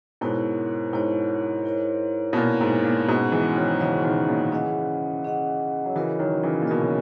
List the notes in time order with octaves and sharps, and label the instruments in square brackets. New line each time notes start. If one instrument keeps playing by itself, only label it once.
[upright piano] G#2 B2 [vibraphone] E4 A#4 C#5
[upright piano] G#2 [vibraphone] E4 A#4 C#5
[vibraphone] E4 A#4 C#5
[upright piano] B2
[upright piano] A#2 [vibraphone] E4 A#4 C#5
[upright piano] G#2
A#2
[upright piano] G#2 B2 [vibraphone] C#4 G#4 D#5 F#5
[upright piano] E3 G#3
D#3 F#3
[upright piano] C#3 E3 [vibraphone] C#4 G#4 D#5 F#5
[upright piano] B2 D#3
A#2 C#3
[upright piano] C#3 E3 [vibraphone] C#4 G#4 D#5 F#5
[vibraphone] C#4 G#4 D#5 F#5
[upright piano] F#3
[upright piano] C#3 E3 [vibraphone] C#4 F#4 A#4 D#5
[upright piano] D#3 F#3
C#3 E3
A#2
[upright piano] B2 [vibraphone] C#4 F#4 A#4 D#5
[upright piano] C#3